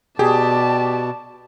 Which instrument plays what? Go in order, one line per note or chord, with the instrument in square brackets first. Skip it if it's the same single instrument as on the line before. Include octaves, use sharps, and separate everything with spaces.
[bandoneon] B2 [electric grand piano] G4 [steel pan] G#4 [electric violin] D5 A5